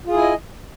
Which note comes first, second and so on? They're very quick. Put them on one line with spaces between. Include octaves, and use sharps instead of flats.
F4 G#4 E4 G#5 D#5